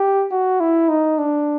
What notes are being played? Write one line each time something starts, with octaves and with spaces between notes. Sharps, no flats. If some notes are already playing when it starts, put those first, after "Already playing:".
Already playing: G4
F#4
E4
D#4
D4